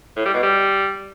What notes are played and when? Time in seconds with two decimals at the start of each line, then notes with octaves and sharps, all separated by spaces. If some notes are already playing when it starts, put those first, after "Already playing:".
0.17 A2
0.25 G3
0.34 B2
0.42 G3